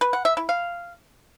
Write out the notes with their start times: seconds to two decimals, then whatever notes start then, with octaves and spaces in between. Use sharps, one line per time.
0.01 B4
0.13 F#5
0.25 E5
0.37 E4
0.49 F5